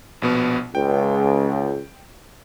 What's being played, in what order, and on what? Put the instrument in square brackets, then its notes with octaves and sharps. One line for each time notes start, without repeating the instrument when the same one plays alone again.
[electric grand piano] A#1 B2 B3
[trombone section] C#2 [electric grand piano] G5